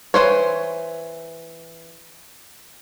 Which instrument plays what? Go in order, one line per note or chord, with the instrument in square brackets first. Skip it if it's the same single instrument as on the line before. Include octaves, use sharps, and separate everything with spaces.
[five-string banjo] E3 C4 C5 C#5